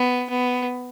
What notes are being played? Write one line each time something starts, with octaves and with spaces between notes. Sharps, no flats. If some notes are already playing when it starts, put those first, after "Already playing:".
Already playing: B3
B3